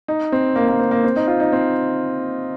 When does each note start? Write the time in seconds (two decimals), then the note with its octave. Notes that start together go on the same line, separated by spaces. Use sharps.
0.08 D#4
0.32 C4
0.56 A#3
0.68 A#3
0.79 C4
0.91 A#3
1.04 C4
1.16 D#4
1.28 F4
1.40 D#4
1.52 C4